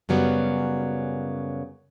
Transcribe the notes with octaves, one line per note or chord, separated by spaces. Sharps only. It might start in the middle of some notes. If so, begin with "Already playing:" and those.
F#2 C#3 F#3 G3 B3